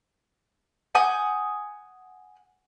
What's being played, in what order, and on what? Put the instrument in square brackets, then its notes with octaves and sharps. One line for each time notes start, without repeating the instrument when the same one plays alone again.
[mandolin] F#5 G#5 D#6 G6